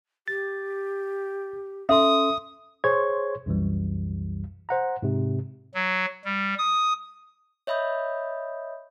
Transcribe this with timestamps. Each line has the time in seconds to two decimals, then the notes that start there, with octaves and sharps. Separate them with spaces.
0.28 G4 A6
1.89 C#4 A4 E5 C6 D#6
2.84 G#4 C5 C#5 C6 C#6 G#6
3.46 C2 F#2 E3 G3
4.69 C5 F#5 A#5
5.02 G#2 C3
5.74 F#3
6.25 G3
6.58 D#6
7.67 C#5 D#5 E5 B5 D#6 G6